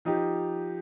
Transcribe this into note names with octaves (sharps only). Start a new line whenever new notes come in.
F3 D#4 G4